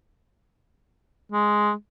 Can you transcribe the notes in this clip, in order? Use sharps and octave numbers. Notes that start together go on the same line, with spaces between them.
G#3